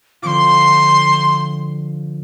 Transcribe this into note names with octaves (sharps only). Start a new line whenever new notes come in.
D3 F3 C4 F4 C6 D6